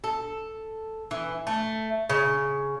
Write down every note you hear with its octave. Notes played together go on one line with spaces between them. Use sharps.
A4
E3
A3
C#3